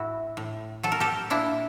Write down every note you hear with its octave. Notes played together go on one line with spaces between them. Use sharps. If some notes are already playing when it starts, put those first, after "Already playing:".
Already playing: A2 E4 F#4
A2
F#3 A4
A#4
G4 A4
A#2 D4 E4